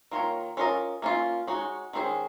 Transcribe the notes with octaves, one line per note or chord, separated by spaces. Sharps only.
D#3 A#3 F4 A#4 C#5
C#4 F4 A#4 D#5
A#3 C#4 F4
G#3 D#4 F#4 C#5
D#3 G#3 C#4 G#4 C5